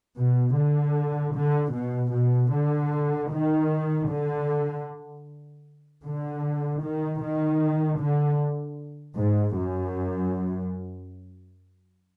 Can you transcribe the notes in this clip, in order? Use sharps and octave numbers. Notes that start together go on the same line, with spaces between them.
B2
D3
D3
B2
B2
D3
D#3
D3
D3
D#3
D#3
D3
G#2
F#2